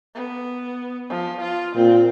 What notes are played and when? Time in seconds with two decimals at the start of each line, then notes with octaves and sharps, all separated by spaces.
0.15 B3
1.10 F3
1.41 F4
1.75 A#2 C4